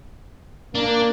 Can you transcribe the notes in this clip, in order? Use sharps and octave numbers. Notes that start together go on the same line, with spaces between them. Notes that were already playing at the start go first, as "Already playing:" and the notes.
A#3 D4